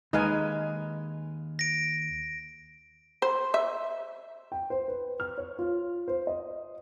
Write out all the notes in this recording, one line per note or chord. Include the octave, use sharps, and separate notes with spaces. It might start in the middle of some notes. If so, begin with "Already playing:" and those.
D#2 G#3 D#4 B4 F5 G#5
A#6 D7
C5
E5
G5
C5
B4
F6
C#5
F4
C5
D#5